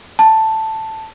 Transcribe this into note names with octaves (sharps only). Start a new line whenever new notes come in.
A5